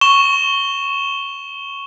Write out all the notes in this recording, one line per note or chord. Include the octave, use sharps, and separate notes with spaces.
C#6 E7 G7